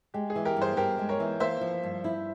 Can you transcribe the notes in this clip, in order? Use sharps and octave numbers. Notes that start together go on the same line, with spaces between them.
G#3 G4
G#4
E3
G4 A#4
G2
G#4 C5
G2 G4 A#4
G#3
A#4 C#5
E3
A#3 C5 E5
F3
G2
E4